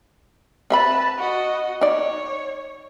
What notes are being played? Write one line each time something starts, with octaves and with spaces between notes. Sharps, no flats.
C4 B4 E5 A5 B5
F#4 D#5
D#4 C#5 D5